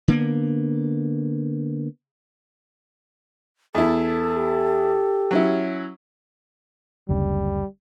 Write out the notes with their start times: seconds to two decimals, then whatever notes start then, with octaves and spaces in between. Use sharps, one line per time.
0.08 D3 A#3 B3
3.75 E2 E4 A4
4.37 G4
5.31 F#3 C#4 E4
7.09 F#1 D2 C#3 G3